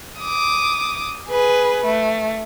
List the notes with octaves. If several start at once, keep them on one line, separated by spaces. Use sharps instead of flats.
D6 D#6
G#4 B4
A3